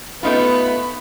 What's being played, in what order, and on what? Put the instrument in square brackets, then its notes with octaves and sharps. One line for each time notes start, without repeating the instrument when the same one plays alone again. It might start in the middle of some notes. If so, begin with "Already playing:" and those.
[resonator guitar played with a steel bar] A3 D#4 F4 [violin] B3 [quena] B5